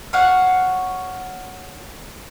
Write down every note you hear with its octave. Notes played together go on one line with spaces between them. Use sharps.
C#5 F5 F#5